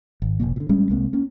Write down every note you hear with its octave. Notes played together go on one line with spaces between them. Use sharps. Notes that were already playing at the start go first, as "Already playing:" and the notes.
G#1
F1 A#1 B2 A#3
A#2 D3
A1 G3 G#3 C#4
C2 G#3 A#3 C4
A#3 C#4